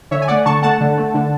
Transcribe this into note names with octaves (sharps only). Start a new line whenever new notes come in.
D3 C#5 E5
G#5
A3 D5 F#5
D3 A5 C#6
A3 F#5 A5
D3
A3
D3